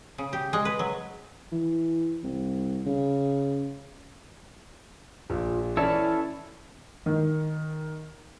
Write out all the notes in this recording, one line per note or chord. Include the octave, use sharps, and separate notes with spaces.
C#3
G4
G#3
B4
F#3
E3
C2
C#3
A#1 F4
E3 C#4 E4 A4 C#5 D5
D#3